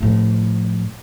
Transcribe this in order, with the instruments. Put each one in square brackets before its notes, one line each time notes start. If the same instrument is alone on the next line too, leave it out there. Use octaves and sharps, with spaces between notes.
[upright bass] A2 F3